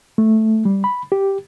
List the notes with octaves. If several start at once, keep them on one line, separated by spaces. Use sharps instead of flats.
A3
G3
B5
G4